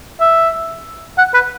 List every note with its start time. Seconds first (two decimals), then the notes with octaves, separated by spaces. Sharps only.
0.20 E5
1.18 F#5
1.34 B4